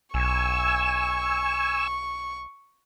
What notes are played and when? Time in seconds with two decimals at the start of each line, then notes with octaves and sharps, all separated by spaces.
0.14 B1 G#5 C#6 E6